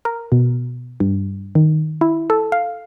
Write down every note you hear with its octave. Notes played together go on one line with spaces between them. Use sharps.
A#4
B2
G2
D#3
E4
A4
F5